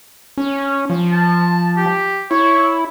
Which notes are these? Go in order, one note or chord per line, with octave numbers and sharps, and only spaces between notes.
C#4
F3
A5
G4
E4 C#5